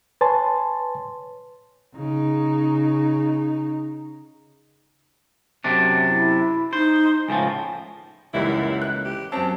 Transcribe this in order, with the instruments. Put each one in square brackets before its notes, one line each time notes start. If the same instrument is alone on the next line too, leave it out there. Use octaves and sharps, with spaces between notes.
[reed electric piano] B4 C#5 G#5 A5 C6 A6
[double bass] C#3 D#4
[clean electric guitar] F#2 C3 D4
[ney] E4
[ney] D#4 [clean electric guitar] C5
[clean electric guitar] C#2 A2 F3 [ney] G#5
[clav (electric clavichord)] C#2 E3 D#4 [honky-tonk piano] F#2 G3 A#3 [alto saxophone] E4
[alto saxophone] A3 [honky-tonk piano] F#6
[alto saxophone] G4
[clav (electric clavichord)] F#2 C#4 [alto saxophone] C4 [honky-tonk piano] A5